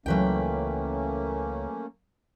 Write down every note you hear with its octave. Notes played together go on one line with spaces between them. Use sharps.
C#2 E3 F#3 A3 A#3 C#4 B4 G5